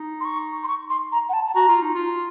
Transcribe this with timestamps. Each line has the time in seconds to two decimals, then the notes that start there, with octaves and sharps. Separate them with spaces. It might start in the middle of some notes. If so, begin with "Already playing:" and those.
Already playing: D#4
0.20 C6
0.25 C#6
0.64 C6
0.68 C#6
0.90 C6
1.12 A#5
1.29 F#5
1.33 A5
1.47 A5
1.54 F#4 A#5
1.68 F4
1.82 D#4
1.95 F4